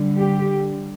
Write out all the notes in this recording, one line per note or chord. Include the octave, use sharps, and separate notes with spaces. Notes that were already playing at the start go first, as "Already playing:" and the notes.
Already playing: D3 G3
G4